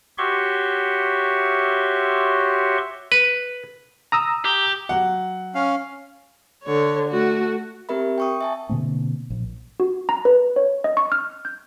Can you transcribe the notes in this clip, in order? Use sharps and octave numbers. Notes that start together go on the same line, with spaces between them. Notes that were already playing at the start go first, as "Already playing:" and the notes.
F#4 G4 C#5 E5 C6 C#6
B4
A#5 D#6 E6
G4
F#3 F#5
C#4 F5
D3 C#5
A3 F#4
C4 G4 A#4 E5 B5
G5 C#6 D#6
E5 G#5 A5
B2 D3 A#3 C4
A#1
F#4
A#5
B4
C#5
D#5
C#6
F6
G6